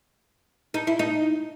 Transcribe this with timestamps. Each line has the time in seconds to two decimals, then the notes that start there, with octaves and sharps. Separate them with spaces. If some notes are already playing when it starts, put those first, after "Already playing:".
0.74 D#4
0.87 E4
0.99 D#4